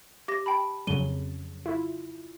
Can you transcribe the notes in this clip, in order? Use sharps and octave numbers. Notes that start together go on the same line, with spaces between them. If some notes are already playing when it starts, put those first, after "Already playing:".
G4 D6 A#6
G5 A5 B5
F2 C#3 F#3 D#7 G7
E4 F4